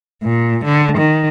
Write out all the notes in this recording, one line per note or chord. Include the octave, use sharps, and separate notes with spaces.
A#2
D3
D#3